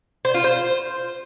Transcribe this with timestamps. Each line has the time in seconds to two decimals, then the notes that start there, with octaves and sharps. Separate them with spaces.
0.25 C5
0.34 F4
0.44 C5